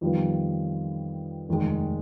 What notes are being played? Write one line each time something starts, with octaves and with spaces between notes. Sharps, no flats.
F2 D#3 G3 B3 F4
F1 D#2 D#3 G#3